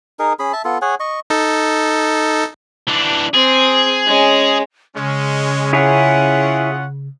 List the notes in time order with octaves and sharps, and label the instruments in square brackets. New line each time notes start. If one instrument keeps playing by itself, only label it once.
[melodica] D#4 G#4 A#4
C#4 G#4 B5
E5 A5
B3 F4 A4
G#4 C#5 F#5 G#5
D#5 C#6
[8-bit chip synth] D#4 A4
[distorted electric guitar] E3 D4
[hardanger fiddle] C4 [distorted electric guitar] G#4
[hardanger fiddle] G#3 C#4
[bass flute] C#3 [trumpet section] G#3 C#4
[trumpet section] C#4 F4 F#5 [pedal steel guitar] E4 G#4 C#5